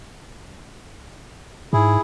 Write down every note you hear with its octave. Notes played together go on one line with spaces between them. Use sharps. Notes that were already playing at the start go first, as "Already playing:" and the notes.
G#2 E4 G#4